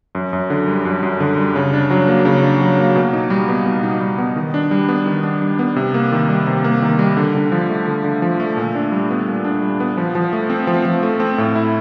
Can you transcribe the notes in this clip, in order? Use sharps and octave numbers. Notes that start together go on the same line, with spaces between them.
F#2
F#2
D3
G3
F#2
F#2
D3
G3
C#3
D4
F#3
A#3
C#3
D4
F#3
A#3
B2
D#4
G3
B3
B2
D#4
G3
B3
D#3
D4
G3
B3
D#3
D4
G3
B3
C3
A#3
D#3
G3
C3
A#3
D#3
G3
D3
D3
F3
A3
D3
D3
F3
A3
A#2
D4
G3
B3
A#2
D4
G3
B3
F3
F3
A3
C4
F3
F3
A3
C4
A2
E4